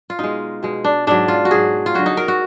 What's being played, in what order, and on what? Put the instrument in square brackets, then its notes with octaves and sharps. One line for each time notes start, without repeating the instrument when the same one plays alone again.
[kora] F4
B2 G#3 D#4
B2 G#3
D4
G#2 F#3 D4
F4
F#4
G#2 F#3 G#4
F4
D3 F#3 F#4
D#4
A#4
F#4